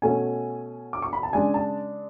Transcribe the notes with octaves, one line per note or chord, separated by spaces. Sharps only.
B2 A3 C#4 G#5
D6
C#6
B5
A5
C#3 G#3 D4 G#5
A5